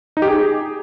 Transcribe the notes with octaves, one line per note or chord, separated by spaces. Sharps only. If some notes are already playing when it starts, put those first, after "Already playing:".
D#4
G4
G#4